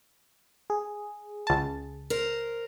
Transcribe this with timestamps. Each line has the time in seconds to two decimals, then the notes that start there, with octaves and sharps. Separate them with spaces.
0.70 G#4
1.47 C#2 A5
2.10 A#4 C5